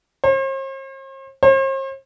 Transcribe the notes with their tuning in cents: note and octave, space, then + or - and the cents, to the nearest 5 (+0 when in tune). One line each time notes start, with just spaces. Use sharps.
C5 +45
C5 +45